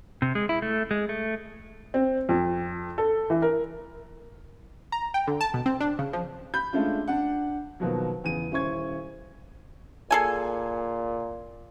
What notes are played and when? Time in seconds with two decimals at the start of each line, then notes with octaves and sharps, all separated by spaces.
0.22 C3
0.35 G#3
0.49 E4
0.62 A3
0.91 G#3
1.09 A3
1.94 C4
2.29 F2
2.98 A4
3.30 E3
3.42 A#4
4.92 A#5
5.14 G5
5.27 D3
5.41 A5
5.54 B2
5.66 C4
5.80 D4
5.99 C#3
6.13 F3
6.54 B5 G6
6.73 G#3 A3 C#4 D4 F4
7.08 D4 F#5
7.80 D#2 B2 F3 F#3
8.24 E2 C#3 D#7
8.51 D#1 C#4 E4 C5 C#6 G#6
10.11 A#2 G#4 A4 G#5